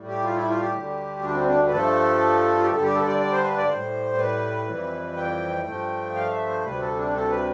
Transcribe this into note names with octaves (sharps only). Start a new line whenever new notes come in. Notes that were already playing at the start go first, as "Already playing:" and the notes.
Already playing: A2 G3
G4
F4
E4
F4
G4
D2 D3 G3
D4
C4
D4
B4
G2 F3 A3 A4
F4
G4
G2 D3 G3 A4
G4
A4
D5
D5
C5
B4
D5
A2 G3 C5
B4
F2 E3 G3
G5
G2 F3 A3
F5
E5
C5
D2 C3 G3 B4
A4
D4
A4
B4